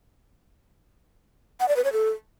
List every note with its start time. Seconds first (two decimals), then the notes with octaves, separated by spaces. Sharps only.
1.60 F#5
1.68 D5
1.76 B4
1.84 C#5
1.93 A4